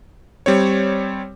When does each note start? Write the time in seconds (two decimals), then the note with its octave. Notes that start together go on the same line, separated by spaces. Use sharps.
0.46 G3 C4 C#5